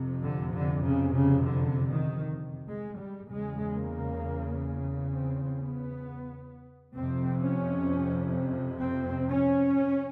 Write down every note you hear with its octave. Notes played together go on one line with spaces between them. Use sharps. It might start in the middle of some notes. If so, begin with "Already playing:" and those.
Already playing: F2 C3
D3
D3
C#3
C#3
D3
D#3
G#3
G3
E2 C#3 G#3
A#3
C4
B3
F2 C3 C4
C#4
C4
C#4